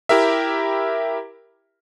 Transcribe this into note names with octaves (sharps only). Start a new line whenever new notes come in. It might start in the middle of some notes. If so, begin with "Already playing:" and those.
E4 G4 A#4 E5